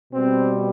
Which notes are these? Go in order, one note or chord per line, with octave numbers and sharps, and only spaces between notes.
B2 G3 C4